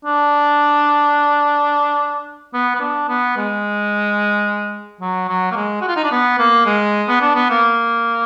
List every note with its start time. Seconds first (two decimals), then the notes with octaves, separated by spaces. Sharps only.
0.05 D4
2.53 B3
2.75 B3
2.80 D4
3.08 B3
3.36 G#3
5.01 F#3
5.28 F#3
5.51 A#3
5.56 G#3
5.81 F#4
5.88 F4
5.96 D#4
6.04 D4
6.12 B3
6.39 A#3
6.66 G#3
7.08 B3
7.21 D4
7.35 B3
7.49 A#3